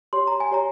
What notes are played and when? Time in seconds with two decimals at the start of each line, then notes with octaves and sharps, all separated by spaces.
0.13 G4 C#5 C6
0.27 A#5
0.40 G#5
0.51 G4 C#5 A#5